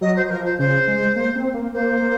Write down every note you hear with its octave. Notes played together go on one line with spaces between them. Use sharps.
F#3 D#5
C5
C5
F3 A#4
C5
C#3 C5
G#3
A#3
C4
A#3
A#3 C5
A#3